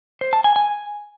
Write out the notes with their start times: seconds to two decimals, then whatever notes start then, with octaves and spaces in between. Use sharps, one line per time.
0.21 C5
0.33 A5
0.44 G#5
0.56 G#5